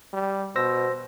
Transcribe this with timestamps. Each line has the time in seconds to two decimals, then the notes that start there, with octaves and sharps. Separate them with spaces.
0.13 G3
0.56 B2 C5 E6 A#6